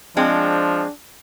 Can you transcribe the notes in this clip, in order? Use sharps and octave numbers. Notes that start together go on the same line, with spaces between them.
F3 G#3 C4 D4